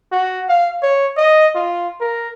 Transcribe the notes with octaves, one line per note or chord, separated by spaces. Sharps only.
F#4
F5
C#5
D#5
F4
A#4